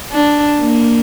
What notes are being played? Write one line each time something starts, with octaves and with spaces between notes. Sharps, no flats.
D4
A#3